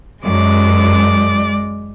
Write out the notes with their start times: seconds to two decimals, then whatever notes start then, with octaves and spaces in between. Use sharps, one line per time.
0.23 F#2 G#3 D5